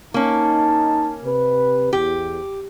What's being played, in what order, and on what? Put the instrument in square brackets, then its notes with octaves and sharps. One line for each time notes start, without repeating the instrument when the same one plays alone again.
[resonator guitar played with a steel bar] A#3 C#4 [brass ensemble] D#4 A5
[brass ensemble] C3 B4
[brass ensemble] E2 [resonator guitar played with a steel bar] G4